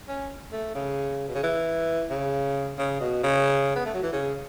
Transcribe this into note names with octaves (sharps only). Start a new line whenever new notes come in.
C#4
A3
C#3
B2
C#3
E3
C#3
C#3
B2
C#3
B3
A3
F#3
E3
C#3